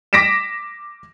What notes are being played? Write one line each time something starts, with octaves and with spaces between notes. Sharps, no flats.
D6 A#6 B6 D7 E7